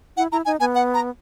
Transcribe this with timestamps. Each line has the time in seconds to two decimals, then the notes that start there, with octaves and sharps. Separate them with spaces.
0.17 E4 F#5
0.32 E4 A#5
0.45 D#4 G#5
0.60 B3 G#5
0.75 F#5
0.94 A#5